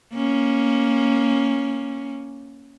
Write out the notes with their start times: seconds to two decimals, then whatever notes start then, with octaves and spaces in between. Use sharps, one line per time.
0.13 A#3 C#4